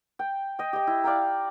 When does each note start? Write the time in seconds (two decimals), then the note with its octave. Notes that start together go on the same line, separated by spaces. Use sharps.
0.19 G5
0.59 D#5 G5
0.73 G4 D#5
0.87 E4
1.04 D5 F5 G5 A#5